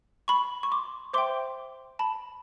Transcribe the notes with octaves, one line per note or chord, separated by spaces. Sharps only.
B5 C#6
C#6
C6 D6
C5 E5 G5 C6 D6
A5 B5